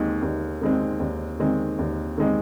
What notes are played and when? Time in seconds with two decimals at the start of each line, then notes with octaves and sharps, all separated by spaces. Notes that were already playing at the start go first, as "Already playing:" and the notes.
Already playing: D#2 D#3 G#3 C4
0.22 D#2
0.62 D#3 G#3 C4
1.00 D#2
1.40 D#3 G#3 C4
1.79 D#2
2.18 D#3 G#3 C4